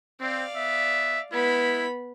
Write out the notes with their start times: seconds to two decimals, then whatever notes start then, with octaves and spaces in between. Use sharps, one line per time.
0.21 C4 D5 F5
0.56 B3 E5
1.33 G#3 B3 E4 B5